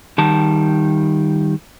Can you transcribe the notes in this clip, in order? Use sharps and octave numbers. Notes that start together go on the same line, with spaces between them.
D#3 G3 A5